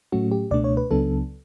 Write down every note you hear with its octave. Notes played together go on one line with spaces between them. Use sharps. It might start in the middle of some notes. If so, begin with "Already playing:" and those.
A2 F#3 A3 C#4 F#4
G4
C#2 B2 A3 D4 D5
C#5
B4
C#2 C#3 F#3 B3 D4 A4